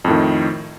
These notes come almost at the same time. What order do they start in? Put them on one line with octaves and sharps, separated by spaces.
F2 A2 D#3